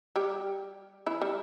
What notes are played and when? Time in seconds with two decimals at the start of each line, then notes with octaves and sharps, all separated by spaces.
0.16 G3 G4
1.06 E3 E4
1.22 G3